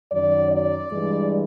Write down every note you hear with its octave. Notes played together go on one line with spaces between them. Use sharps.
F#2 D#3 F#3 D5
D5
G2 E3 G#3